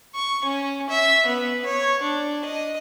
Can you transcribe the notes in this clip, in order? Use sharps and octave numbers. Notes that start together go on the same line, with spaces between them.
C#6
C#4
E5
B3
C#5
D4
D#5